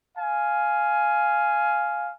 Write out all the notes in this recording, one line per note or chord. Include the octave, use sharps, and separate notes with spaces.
F5 G#5